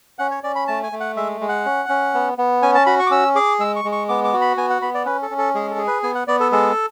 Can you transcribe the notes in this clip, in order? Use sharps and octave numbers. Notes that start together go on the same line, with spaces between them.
C#4 F#5
C#5
C#4 D5
B5
A3 A5
G#5
A3
F#5
G#3 E5
G#3
F#5
C#4
C#4
B3
B3
C#4 G#5
A5
F#4 B5
C#6
D6
C#4 E6
G#4 D6
G#3 E6
C#6
G#3
C#6
B3 D6
D6
F#4
B5
B3 G#5
F#5
B3 B5
D5
C#4 B4
A4
C#4
A4
G#3 G#4
A4
G#4
B4
B3 G#5
F#5
B3 D5
A4
G#3 A4